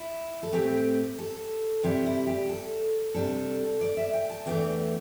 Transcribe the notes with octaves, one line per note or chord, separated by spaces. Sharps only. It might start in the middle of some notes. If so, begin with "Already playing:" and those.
Already playing: E4
A4
A2 A3 C4 G4
A4
C3 G3 E4 G4
E4
G4
A4
C3 G3 D4 A4
D5
E5
G5
A5
E2 E3 A3 D4 G5